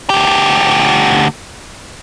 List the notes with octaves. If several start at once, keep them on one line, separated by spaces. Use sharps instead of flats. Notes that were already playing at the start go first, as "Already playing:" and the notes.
D2 G4